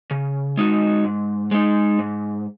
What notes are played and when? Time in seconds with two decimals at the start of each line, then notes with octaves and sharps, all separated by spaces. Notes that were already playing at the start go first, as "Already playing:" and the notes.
0.11 C#3
0.57 G#3 D#4 F#4
1.04 G#2
1.51 G#3 D#4
1.99 G#2